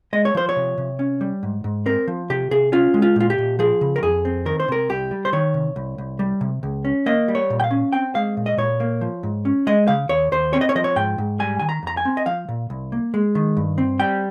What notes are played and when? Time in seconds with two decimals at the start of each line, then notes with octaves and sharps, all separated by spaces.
0.13 G#3 D#5
0.25 C#5
0.35 F3 C5
0.49 C#5
0.56 C3
0.78 C3
0.99 C#4
1.21 G3
1.43 G#2
1.64 G#2
1.86 C4 A#4
2.07 F3
2.30 C3 G4
2.51 C3 G#4
2.72 C#4 F4
2.94 G#3
3.02 F4
3.16 A#2 F4
3.30 G4
3.38 A#2
3.59 F3 G#4
3.81 C#3
3.96 A#4
4.03 F2 G#4
4.25 C4
4.46 D#3 A#4
4.60 C5
4.68 C3 A#4
4.89 C2 G4
5.11 G3
5.25 C5
5.33 D#3 C#5
5.54 C3
5.76 C2
5.98 C2
6.19 G3
6.41 C3
6.63 C#2
6.85 C#4
7.06 A#3 D#5
7.28 G3
7.35 C#5
7.50 A#2
7.60 G5
7.64 F5
7.71 C#4
7.93 C4 G5
8.15 G#3 F5
8.37 A#2
8.46 D#5
8.57 A#2 C#5
8.80 A#3
9.01 F3
9.23 G#2
9.45 C#4
9.67 G#3 D#5
9.88 C#3 F5
10.09 D#2 C#5
10.32 D#2 C5
10.53 C4 C#5
10.61 D#5
10.69 C#5
10.75 F3 D#5
10.84 C#5
10.96 G#2 G5
11.18 G#2
11.39 G3 G#5
11.59 D#3 G#5
11.69 A#5
11.83 F2 A#5
11.97 G#5
12.05 C4
12.17 D#5
12.26 F3 F5
12.49 A#2
12.70 C2
12.92 A#3
13.14 G#3
13.35 D#3
13.57 G2
13.78 C4
13.99 G3 G5